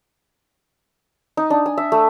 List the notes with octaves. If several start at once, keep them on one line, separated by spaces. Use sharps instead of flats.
D#4
D4
G#5
E5
A3